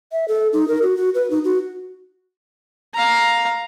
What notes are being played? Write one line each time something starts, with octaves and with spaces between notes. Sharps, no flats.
E5
A4
D#4
A#4
F#4
F#4
B4
D#4
F#4
F5 A#5